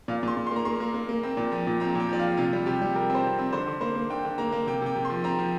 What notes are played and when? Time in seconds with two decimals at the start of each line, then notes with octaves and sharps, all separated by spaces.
0.08 A#2 F5
0.23 A#2 C6
0.37 A#2
0.47 C6
0.51 A#3
0.56 A#5
0.65 A#3 C6
0.80 A#3
0.94 A#3
1.09 A#3
1.23 C4
1.37 A#2
1.52 F3
1.67 A#2
1.80 C4 A#5
1.95 A#2 G5
2.09 F3 D5
2.19 F5
2.23 F3
2.37 C3 F4
2.53 G3
2.66 C3 G4
2.82 G3
2.95 C3 A#4
3.10 C4 C5
3.24 C3
3.39 C4
3.53 D3 C5
3.68 D3
3.81 A#3 C5
3.96 A#3
4.10 D3 G5
4.25 D3
4.38 A#3 A#5
4.52 A#3
4.67 C3 G5
4.82 C3 G5
4.96 C3
5.05 C6
5.10 F3
5.24 C4 A#5
5.39 F3